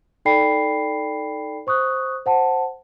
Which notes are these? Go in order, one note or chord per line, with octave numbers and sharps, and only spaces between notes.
D#4 A4 D5 G5 B5 C7
C5 C#6 D#6 F#6
C5 F#5 A5